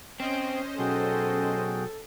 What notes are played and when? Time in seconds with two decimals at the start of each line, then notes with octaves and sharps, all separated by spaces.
0.20 C4 C#4 C5 D#5
0.79 B1 F#4 G#4 A4 G5